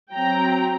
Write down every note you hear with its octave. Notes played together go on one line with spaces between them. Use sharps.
F#3 C4 G5 A#5